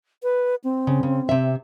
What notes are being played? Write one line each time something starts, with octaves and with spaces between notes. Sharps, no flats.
B4
C4
C#3
C#3
C3 E5